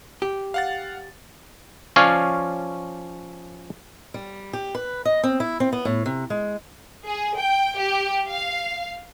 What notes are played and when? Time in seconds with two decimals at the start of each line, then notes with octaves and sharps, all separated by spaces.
0.22 G4
0.54 F5 F#5 A6
1.96 F3 C#4 C#5 D5 F5
4.14 G3
4.53 G4
4.75 B4
5.05 D#5
5.23 C4
5.40 E4
5.60 C4
5.73 B3
5.85 A2
6.06 C3
6.30 G#3
7.06 G#4
7.36 G5
7.78 G4
8.30 F5